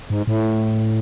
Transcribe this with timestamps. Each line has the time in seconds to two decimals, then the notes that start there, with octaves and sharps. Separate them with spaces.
0.10 G#2
0.27 A2